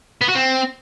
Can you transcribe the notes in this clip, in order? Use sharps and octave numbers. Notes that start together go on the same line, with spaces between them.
B3
F#4
C4